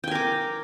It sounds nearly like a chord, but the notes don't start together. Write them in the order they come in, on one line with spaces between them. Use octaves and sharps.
G5 G#5 A#4 D6